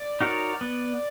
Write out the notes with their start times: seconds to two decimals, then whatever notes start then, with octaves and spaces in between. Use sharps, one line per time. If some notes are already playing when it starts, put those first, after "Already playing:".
Already playing: D5
0.21 D#4 F#4 A#4 C#5
0.61 B3